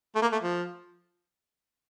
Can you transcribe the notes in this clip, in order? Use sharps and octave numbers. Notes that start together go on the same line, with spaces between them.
A3
A#3
A3
F3